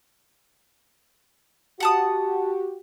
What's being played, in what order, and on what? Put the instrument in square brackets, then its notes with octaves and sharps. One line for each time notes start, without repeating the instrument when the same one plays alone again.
[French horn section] F#4 G4 [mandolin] F#5 A5 D#6